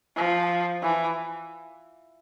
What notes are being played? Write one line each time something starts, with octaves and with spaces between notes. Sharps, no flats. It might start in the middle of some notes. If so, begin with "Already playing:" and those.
F3
E3